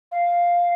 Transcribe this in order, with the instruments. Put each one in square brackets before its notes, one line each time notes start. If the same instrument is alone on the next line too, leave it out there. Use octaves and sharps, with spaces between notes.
[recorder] F5